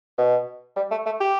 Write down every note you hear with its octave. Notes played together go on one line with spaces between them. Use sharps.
B2
G3
A3
A3
G4